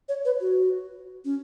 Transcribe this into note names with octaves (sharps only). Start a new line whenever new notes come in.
C#5
B4
F#4
C#4